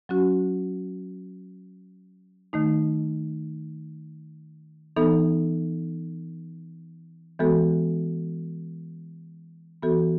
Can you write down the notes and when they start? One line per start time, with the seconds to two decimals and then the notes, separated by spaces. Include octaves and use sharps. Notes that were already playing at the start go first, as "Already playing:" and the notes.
0.09 F#3 C#4 F#4
2.53 D#3 A3 D#4
4.96 E3 B3 D#4 A4
7.39 E3 G#3 B3 F#4 A4
9.82 E3 B3 F#4 A4